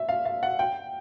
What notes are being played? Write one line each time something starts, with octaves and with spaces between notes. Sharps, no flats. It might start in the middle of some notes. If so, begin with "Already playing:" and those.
Already playing: E5
F5
F5
F#5
G5